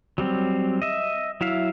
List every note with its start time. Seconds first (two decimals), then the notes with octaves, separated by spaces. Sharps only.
0.18 F#3 G3 C4
0.82 D#5 E5
1.41 F#3 E4 E5 F5